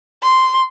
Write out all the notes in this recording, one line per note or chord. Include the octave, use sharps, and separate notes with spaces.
C6